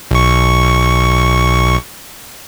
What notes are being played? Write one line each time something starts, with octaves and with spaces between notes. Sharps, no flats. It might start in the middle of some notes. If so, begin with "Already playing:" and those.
B1 C#6